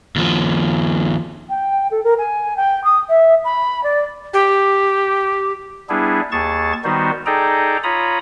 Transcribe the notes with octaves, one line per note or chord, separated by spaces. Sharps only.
D#2 F3
G5
A4
A#4
G#5
G5
D#6
E5
B5
D5
G4
G3 B3 D4 E4 G#4
D#2 G#4 A5 C#6 A6
D#3 G3 B3 D#4 F#4 C5
D#4 G#4 A4 D5 G5 A#5
F4 C#5 A#5 B5 D#6